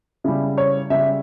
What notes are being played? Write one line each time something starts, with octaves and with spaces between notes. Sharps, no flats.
C#3 G3 E4
C#5
C#3 G3 E5